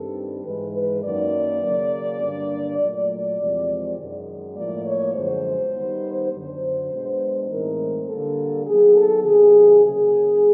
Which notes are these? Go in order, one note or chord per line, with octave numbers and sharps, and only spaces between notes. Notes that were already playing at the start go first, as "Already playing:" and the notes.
Already playing: G2 D#3 G3 C4 A4
G#2 E3 G#3 B4
B4
F#2 D#3 F#3 A#3 D#4 D5
C#3 F#3 A#3 C#4
G2 D3 G3 A#3 D4
A#2 F#3 A3 D5
E2 C3 F3 G#3 C4
F#2 D#3 G#3
A2 F3 A#3 D5
C#5
F#2 D3 F3 G#3 B3 C5
D#3 G3 B3 D#4
F#2 D3 F#3 C5
B2 G#3 B3 D4
A2 E3 G#3 C4 D#4 A#4
D3 G3 A#3 A4
D#3 F#3 B3 G#4
A4
C3 D#3 F#3 G#4
C#3 F#3 A#3 C#4 G#4